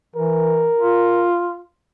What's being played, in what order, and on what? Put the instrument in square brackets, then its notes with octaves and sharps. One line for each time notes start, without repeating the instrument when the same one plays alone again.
[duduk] E3 [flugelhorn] A#4
[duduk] F4